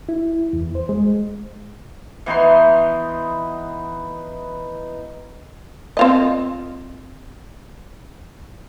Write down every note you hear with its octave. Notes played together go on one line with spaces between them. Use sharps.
E4
E2
C5
G#3
E3 B3 D#4 C6
C4 F4 D#5